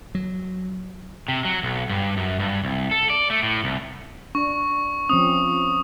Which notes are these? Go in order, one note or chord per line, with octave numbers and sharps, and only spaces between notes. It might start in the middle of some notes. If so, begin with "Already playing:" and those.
F#3
C3
F#3
B1
G2
F#2
G2
C2
A4
D5
A3
A2
C2
D4 C#6
F3 C4 C#4 D#6